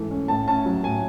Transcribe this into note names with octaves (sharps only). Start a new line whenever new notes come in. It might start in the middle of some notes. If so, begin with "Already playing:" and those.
Already playing: G#2 E3 A3
C#4
A2 A5
C#4 A5
F#3
A2 G#5